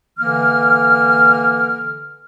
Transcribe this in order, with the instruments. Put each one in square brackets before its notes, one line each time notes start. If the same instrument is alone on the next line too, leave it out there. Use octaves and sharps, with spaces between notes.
[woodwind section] D3 E3 A#3 F6